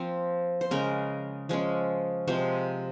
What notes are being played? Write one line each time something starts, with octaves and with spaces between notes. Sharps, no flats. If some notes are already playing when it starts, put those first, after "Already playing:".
Already playing: F3 A#3 C4
C5
C#3 G#3 C#4 A#4
F3 G#3 C#4
C3 F3 G#3 C5